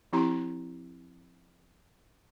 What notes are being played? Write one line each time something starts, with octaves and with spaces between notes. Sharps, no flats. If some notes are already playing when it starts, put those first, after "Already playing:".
F3 C4 E4 G4 A#5 C6